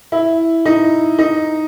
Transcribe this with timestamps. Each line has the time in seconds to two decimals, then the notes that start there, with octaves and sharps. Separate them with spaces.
0.12 E4
0.65 D#4
1.19 D#4